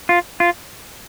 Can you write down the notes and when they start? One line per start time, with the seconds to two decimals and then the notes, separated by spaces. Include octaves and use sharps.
0.09 F4
0.40 F4